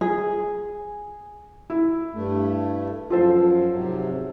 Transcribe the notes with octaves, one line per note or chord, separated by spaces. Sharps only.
G#4
E4
G2 A3
F#2 F3 F4 A4 C5
G#2 C3 F#3